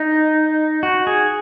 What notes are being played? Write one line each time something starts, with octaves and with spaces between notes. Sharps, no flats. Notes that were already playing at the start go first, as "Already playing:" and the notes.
Already playing: D#4
F#4
G#4